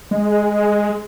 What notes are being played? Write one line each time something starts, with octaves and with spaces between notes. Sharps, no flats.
G#3